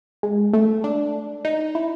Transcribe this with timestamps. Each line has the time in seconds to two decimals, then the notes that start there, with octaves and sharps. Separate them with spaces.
0.23 G#3
0.53 A3
0.84 D4
1.45 D#4
1.75 E4